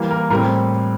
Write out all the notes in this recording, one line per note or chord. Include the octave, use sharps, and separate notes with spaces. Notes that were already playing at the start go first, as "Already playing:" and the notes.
Already playing: E3 G3 A#3
A#4
A2 G3 C4 A#4